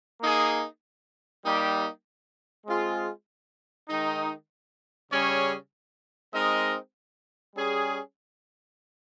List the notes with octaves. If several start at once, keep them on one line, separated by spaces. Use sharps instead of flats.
A#3 D#4 G#4
G3 A#3 D#4 G4
G#3 C4 F4 G#4
D#3 G#3 D#4
C#3 G3 C#4 G#4 C#5
G#3 C4 D#4 A#4 D#5
G3 C#4 G#4